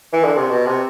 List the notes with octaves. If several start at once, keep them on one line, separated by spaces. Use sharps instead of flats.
E3
D3
C3
B2
C3